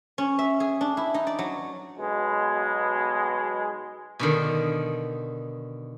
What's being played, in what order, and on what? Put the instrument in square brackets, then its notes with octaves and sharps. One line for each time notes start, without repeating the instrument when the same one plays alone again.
[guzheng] C#4
E5
G#4
D4
E4
D#4
D5
F#3
[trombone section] B1 B2 G#3
[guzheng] B2 D3 D#3